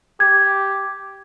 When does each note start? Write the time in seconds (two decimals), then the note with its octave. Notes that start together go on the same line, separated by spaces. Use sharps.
0.20 G4 G#6